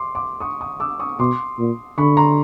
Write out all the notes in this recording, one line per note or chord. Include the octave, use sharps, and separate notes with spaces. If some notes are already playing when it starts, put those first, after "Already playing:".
Already playing: C6 D6
C6 D6
C#6 D#6
C#6 D#6
D6 E6
C#6 D#6
B2 C6 D6
A#2
D3 B5 C#6
A#5 C6